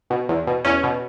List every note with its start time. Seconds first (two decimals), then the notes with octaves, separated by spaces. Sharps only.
0.10 B2
0.29 E2
0.47 B2
0.65 E2 C#4
0.83 B2